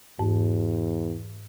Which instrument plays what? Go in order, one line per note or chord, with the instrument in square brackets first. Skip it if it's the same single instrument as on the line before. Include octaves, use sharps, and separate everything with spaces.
[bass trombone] E2 [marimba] G#2